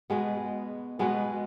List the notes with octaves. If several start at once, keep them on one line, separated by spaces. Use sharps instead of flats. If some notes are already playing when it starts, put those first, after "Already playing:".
B2 G#3 B3
B2 G#3 B3